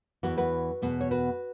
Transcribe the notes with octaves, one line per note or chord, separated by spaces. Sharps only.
E2 E3 B3 F#4 B4
F#4 B4
E2 B2 B3
C#5
F#4 B4